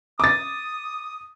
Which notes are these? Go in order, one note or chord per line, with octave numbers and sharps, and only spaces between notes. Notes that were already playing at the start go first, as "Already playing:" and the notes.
D6 D#6 A6